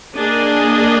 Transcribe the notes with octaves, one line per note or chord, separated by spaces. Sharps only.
A#3 D4 G#4 D#5